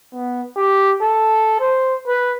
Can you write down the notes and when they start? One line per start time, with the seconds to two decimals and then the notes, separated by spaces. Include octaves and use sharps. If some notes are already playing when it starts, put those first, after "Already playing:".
0.13 B3
0.56 G4
1.02 A4
1.60 C5
2.07 B4